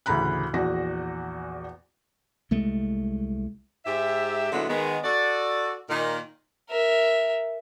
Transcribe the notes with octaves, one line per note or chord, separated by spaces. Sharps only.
A1 D2 C#3 A#5 B5 F#6
A#1 E2 F#4 A#6
C2 G#3 A3
G#2 G4 E5
A#2 D3 F#3 G#3 B3 E4
D#3 G#3 B3
F#4 A4 D5
A#2 D#3 A#4
A#4 E5